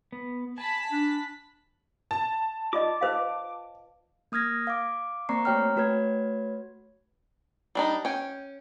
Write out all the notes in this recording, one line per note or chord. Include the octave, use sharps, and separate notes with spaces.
B3
G#5 A5 B5 B6
D4
A5
F4 D5 D#5 D6
B4 C5 F5
A#3 D#6 F6 G#6 A#6
F5 D6
A#3 C4 D5 A#5 C#6 C7
A3 F#4 C#5 G5 A#5 F6
A3 F#4 B4 C#5 G#6
G3 D4 D#4
C#4 G5